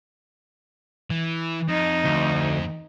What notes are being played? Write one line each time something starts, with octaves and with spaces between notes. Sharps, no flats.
E3
F2 D#4
D2